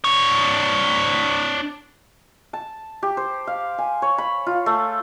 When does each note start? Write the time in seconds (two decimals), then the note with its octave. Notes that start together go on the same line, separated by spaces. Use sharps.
0.04 D4 C#5
2.53 A5
3.02 G4
3.17 C5
3.47 F5
3.78 G#5
4.02 C#5
4.18 B5
4.46 F4
4.66 A3